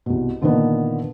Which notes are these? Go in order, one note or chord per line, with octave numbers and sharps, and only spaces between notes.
C2 B2
A#2 D3 D#3 A#3 B3